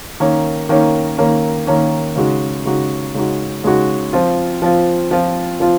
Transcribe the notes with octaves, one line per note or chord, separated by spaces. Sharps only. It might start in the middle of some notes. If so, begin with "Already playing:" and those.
D#3 A#3 C#4
D#3 A#3 C#4
D#3 A#3 C#4
D#3 A#3 C#4
C#3 G#3 D#4 F#4
C#3 G#3 D#4 F#4
C#3 G#3 D#4 F#4
C#3 G#3 D#4 F#4
F3 C4 F4
F3 C4 F4
F3 C4 F4
F3 C4 F4